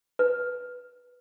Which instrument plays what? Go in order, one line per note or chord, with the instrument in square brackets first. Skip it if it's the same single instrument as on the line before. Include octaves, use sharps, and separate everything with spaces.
[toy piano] B4